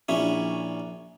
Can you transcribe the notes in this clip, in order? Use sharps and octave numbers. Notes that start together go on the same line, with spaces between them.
A#1 C#4 E4